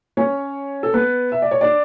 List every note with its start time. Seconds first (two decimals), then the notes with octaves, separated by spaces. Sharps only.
0.17 C#4 C#5
0.83 A4
0.94 B3 B4
1.32 E5
1.42 D5
1.51 C#5
1.61 D4 D5